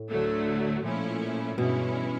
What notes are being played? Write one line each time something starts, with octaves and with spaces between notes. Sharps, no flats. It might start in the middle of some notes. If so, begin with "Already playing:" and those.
Already playing: A2
D2 D3 F#3 A3
A#2 F3 A3 C#4 E4
G2 B2 E3 G#3 C#4 E4